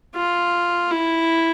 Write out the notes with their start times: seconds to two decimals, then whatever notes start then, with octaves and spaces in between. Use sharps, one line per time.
0.16 F4
0.91 E4